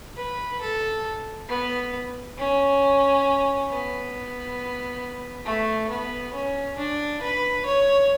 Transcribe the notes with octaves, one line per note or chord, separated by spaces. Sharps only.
B4
A4
B3
C#4
B3
A3
B3
C#4
D4
B4
C#5